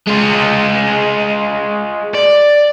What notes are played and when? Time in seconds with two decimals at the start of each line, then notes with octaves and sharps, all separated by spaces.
0.07 G#3 F4
2.15 D5